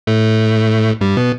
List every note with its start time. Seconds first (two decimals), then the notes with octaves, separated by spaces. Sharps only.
0.07 A2 A3
1.01 G2 G3
1.17 B2 B3